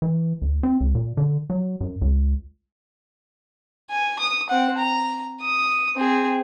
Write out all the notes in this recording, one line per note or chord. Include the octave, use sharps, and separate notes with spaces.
E3
D2
C4
C#2
A#2
D3
F#3
F#2
C#2
G#5
D#6
C4 F#5
A#5
D#6
C4 G#4